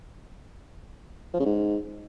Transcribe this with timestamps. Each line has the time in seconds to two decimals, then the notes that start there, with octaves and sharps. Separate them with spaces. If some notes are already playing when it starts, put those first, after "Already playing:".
1.34 F3
1.40 C#3
1.46 G#2